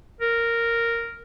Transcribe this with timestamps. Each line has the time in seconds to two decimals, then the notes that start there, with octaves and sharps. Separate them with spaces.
0.21 A#4